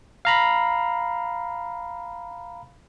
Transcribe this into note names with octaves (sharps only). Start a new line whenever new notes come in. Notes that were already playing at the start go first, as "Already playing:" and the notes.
F5 A#5 B5